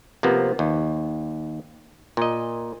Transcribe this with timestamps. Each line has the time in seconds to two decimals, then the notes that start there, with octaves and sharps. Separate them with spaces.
0.23 C3 F3 A#3 B3
0.59 D#2
2.17 A#2 D#5